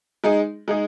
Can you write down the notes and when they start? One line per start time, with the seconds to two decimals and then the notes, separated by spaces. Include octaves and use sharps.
0.24 G#3 D#4 G#4
0.68 G#3 D#4 G#4